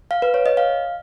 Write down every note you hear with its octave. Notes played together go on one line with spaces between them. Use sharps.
F5
B4
C#5
D#5
F5